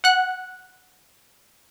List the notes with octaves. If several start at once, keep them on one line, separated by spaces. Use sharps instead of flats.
F#5 F#6